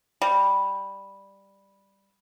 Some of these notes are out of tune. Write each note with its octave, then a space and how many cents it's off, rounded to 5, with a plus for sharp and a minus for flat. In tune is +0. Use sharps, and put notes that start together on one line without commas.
G3 +5